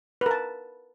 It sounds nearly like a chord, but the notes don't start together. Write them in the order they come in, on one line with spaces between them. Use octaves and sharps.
B4 A#4 A5